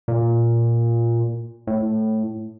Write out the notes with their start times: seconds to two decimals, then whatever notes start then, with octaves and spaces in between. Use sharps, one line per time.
0.08 A#2
1.67 A2